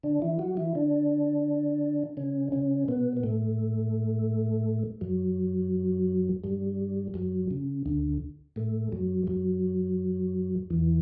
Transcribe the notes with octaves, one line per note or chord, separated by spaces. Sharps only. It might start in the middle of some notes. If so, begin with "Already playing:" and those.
D3 D4
E3 E4
F#3 F#4
E3 E4
D3 D4
C#3 C#4
C#3 C#4
B2 B3
B3
A2 A3
F#2 F#3
G2 G3
F#2 F#3
C#3
D2 D3
A2 A3
F#2 F#3
F#2 F#3
E2 E3